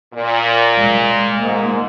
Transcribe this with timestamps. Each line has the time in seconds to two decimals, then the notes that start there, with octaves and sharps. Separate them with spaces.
0.13 A#2
0.77 G#3
1.40 G#2 A#3